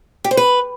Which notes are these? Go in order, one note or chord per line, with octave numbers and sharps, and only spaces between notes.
G4
C5
B4